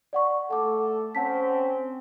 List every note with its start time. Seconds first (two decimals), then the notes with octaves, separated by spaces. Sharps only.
0.13 D5 F#5 C#6
0.50 A3 A4 F#5 D6
1.15 C4 C#4 F#5 A5 B6